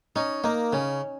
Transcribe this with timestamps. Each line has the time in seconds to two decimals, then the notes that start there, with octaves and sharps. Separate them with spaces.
0.16 C#4 D#4
0.44 A#3 D#4
0.73 C#3 C#4